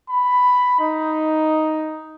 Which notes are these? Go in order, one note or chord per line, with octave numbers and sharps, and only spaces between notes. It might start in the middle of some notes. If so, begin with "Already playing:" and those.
B5
D#4